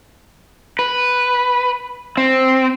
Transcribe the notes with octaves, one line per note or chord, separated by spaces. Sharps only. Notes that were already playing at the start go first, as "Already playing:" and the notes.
B4
C4